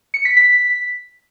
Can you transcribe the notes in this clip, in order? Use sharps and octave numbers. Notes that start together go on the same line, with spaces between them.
C#7
B6
B6